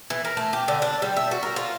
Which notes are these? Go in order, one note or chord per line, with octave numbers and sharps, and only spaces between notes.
E3
A#4
A3
G4
D3
D4
G3
E5
F#4
A#4
F4